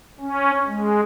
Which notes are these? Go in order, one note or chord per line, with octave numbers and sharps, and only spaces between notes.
C#4
G#3